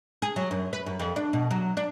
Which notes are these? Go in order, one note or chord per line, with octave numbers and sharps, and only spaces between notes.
G#4
F#3
F#2
B4
F#2
F2
D4
B2
F#3
D4